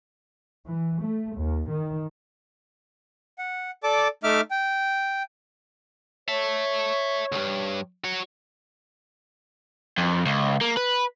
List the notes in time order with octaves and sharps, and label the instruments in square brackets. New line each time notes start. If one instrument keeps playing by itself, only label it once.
[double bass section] E3
A3
D#2
D#3
[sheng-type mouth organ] F#5
A4 D5 A5 D6
A3 D#4 E5 D6 F6
G5
[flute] C#5 [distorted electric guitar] E5 A5
[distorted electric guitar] D2 G2
F#4 C#5
[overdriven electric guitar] F2
C#2
A#3
B4